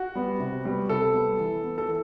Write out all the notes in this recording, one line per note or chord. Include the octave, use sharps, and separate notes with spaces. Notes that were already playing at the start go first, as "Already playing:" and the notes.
Already playing: F#4
G3 B3
C3
G3 B3
C3 A4
G3 B3
E3
B3
A4
E3